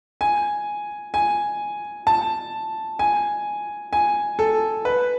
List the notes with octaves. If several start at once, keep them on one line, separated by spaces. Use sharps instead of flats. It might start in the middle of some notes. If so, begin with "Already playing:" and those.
G#5
G#5
A5
G#5
G#5
A4
B4